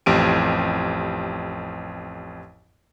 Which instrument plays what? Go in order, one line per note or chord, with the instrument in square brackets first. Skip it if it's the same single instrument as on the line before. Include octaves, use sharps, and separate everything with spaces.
[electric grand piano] A1 F2 G4 D7 D#7